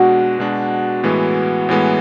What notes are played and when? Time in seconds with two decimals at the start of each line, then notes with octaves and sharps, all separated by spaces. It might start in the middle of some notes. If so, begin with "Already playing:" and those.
Already playing: B2 G#3 D4 F#4
0.39 B2 G#3 D4
1.03 A2 E3 G#3 B3
1.69 A2 E3 G#3 B3